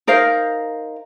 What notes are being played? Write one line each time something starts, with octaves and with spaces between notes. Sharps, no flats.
D#4 A#4 C5 F5